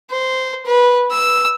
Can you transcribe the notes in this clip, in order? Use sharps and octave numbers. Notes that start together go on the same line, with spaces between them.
C5
B4
E6